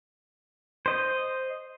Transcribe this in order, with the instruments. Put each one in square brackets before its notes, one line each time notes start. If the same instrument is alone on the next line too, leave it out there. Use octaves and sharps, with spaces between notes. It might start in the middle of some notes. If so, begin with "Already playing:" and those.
[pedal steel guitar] C5 D#5